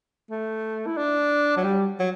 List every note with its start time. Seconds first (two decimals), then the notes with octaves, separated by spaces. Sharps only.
0.31 A3
0.86 E4
0.97 D4
1.57 F#3
1.64 G3
1.99 F#3